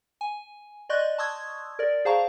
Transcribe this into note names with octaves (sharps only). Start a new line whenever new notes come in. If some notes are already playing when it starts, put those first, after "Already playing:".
G#5
D5 D#5 C6 C#6 F#6 G6
A5 C6 C#6 D#6 E6 G#6
A#4 D5
G#4 C5 F5 A5 A#5 C#6